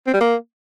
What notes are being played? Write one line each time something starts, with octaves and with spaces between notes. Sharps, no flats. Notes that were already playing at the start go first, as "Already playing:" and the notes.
C4
G3
A#3